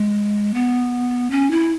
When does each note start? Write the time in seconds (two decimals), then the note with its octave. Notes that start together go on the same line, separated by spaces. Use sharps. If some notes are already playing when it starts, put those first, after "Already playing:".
Already playing: G#3
0.54 B3
1.31 C#4
1.51 E4